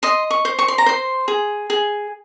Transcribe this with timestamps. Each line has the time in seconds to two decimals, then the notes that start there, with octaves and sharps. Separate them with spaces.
0.03 D#5 C6
0.31 C#6
0.45 C5
0.59 C#6
0.68 C6
0.78 A#5
0.86 C5 C6
1.28 G#4
1.70 G#4